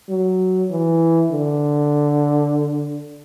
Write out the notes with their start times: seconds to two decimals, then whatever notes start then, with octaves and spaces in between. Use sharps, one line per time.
0.09 F#3
0.70 E3
1.31 D3